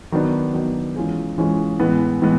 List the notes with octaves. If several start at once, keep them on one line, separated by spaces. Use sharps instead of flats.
D#3 F#3 B3 D4
D#3 F#3 B3 D4
E3 G#3 C#4 F4 G#4
E3 G#3 C#4 F4 G#4
A2 E3 G#3 B3
A2 E3 G#3 B3